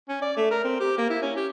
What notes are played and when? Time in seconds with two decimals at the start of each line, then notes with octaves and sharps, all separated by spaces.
0.09 C#4
0.22 D5
0.37 A3
0.51 A#4
0.64 C4
0.80 G4
0.97 A#3
1.10 E4
1.22 C#4
1.36 G4